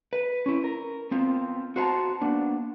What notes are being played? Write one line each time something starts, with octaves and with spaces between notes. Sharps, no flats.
B4
C#4 E4
A#4
B3 C4 F4
F#4 C5 F#5 A5 A#5
A#3 B3 D4